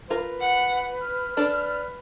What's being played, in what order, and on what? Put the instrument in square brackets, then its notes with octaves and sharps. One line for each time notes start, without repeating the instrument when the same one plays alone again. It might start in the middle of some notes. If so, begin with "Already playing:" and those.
[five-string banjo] F4 A#4 [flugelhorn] B4
[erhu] F#5
F6
[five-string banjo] D4 A4 D5 [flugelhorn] B4